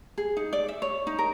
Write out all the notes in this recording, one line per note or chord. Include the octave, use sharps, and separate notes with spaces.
G#4
D#4
D5
E5
C#5
D#4
A#4